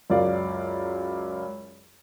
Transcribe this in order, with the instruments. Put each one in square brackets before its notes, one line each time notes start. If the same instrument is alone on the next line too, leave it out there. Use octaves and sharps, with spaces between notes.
[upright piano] C#2 F#2 A#4 D5 F5